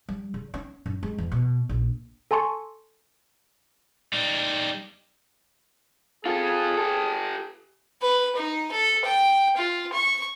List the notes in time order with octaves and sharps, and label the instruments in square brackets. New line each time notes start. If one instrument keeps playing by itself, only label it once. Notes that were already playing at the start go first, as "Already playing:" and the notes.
[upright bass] G3
C#3
C#4
F#2
G#3
E2
B2
A#1
[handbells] A4 G#5 A5 C6 C#6 C#7
[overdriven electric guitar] G3 D#4
[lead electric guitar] F4 A4 [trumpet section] G#4
[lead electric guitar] G4 A4
[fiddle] B4
D#4
A4
G5
F4
C#6